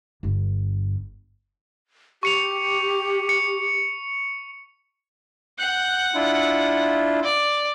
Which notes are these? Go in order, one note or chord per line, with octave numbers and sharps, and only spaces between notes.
G1 G2
G4 C#6 C#7 F7
C#7
F#5 F#6 G6
D4 E4 F4
D5